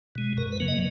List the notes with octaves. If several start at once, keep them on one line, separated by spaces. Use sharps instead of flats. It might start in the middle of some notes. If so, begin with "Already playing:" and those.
B2 G#3
F#2 A#4
B4
C#3 F#3 A#3
D#5